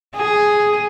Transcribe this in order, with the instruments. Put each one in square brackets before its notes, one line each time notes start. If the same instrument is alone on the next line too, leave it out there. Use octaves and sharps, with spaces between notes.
[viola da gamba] G#4